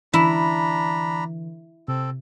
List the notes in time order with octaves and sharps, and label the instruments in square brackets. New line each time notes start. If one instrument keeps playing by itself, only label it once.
[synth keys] D3 E3 [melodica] D4 A#5 B5 [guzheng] E4
[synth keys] C3 [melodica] C4 A4